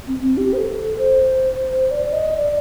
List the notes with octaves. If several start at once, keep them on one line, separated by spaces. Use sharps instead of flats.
C4
C4
G4
C5
A4
C5
D5
D#5
D5